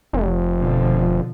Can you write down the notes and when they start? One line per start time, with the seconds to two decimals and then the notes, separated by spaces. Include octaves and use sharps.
0.13 F1
0.57 B2 D3 F3